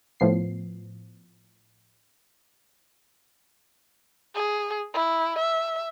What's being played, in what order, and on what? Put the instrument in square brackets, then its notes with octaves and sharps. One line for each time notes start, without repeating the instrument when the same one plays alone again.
[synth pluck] A2 F3 B3 C7
[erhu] G#4
E4
E5